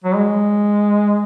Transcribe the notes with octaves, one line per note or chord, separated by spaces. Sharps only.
F#3
G#3